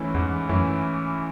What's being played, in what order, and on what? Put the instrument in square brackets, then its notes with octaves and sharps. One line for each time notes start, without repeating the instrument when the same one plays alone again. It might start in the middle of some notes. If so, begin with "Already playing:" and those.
Already playing: [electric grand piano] G#2 E3 A3 C#4 E4
[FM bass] E2 [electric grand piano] G#2
[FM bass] F#2 [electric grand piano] E3 A3 C#4 E4